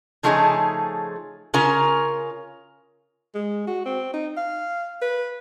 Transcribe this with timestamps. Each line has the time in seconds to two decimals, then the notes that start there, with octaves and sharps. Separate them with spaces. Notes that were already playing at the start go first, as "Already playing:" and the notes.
0.23 C#3 F3 A3 D#4 G#4 C#5
1.54 C#3 C#4 F4 A#4
3.35 G#3
3.67 F#4
3.85 C4
4.14 D#4
4.37 F5
5.02 B4